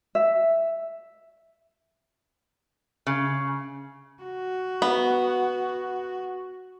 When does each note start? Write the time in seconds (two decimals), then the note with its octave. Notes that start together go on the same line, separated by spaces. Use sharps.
0.15 E5
3.07 C#3
4.23 F#4
4.82 B3